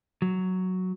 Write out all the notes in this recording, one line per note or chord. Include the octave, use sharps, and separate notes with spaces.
F#3